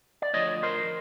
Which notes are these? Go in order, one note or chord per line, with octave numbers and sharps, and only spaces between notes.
D5
D2 D3 F3 C#5 D#5
A#4 C5